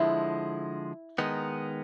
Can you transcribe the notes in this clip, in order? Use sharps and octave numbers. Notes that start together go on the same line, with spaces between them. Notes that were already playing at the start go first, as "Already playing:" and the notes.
Already playing: D3 F3 G#3 E4
D#3 G#3 B3 D#4